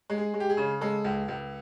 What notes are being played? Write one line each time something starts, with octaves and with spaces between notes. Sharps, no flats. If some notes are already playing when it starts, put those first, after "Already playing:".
G#3
G#4
G#3
G4
G#4
C#3
G#3 A4
C#2
C#2